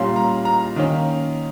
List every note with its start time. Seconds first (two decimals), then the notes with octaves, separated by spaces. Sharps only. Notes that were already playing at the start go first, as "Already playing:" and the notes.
Already playing: A#2 G3 A#3 C#4 C6
0.16 A#5
0.45 A#5
0.76 D#3 A#3 C#4